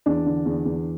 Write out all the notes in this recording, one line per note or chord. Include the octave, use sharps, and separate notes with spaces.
E2 D4
D3
E2
E2